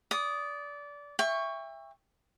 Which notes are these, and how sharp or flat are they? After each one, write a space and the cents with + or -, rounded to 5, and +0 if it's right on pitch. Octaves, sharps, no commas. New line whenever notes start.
D5 -20 D#6 +0
E5 +10 G5 +35 C#6 +0